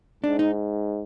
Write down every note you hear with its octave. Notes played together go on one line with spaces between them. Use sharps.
G#2 D4
D#4